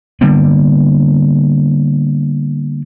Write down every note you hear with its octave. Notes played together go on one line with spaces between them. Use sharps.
D3 G3 A#3 B3